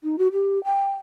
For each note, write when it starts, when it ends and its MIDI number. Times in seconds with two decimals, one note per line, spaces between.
0.03 0.18 63
0.18 0.28 66
0.32 0.62 67
0.64 0.91 79